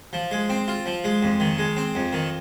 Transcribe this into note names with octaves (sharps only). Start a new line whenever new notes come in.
F3
G#3
C4
F4
F3
G#3
F2
D#3
G#3
C4
F2
D#3